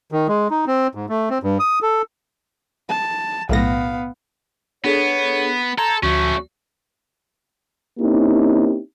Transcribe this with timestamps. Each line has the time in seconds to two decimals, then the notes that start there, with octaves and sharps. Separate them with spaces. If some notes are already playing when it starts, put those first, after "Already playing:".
0.12 D#3
0.29 G#3
0.51 D#4
0.67 C4
0.95 G#2
1.09 A3
1.30 C4
1.43 G2
1.59 D#6
1.82 A4
2.89 A5
3.49 B1 A2 B3 F5 A#6
4.85 B3 D4 G#4 A4 C#5
5.78 A4 A#5 C6 G6 G#6
6.03 D2 F3 A3 C#4 F#4
8.00 A#3 C4 C#4 D#4 E4 G4